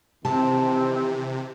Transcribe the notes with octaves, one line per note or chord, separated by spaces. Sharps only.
C3 D#3 E3 C4 G4 A5